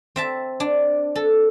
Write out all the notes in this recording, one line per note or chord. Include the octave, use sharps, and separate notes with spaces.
C4 E5 A5
D4
A4